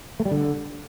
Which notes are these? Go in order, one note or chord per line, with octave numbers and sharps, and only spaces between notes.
A3
G3
D3